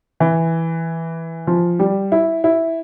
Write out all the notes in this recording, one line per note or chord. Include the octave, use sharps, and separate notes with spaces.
E3
F3
G3
E4
E4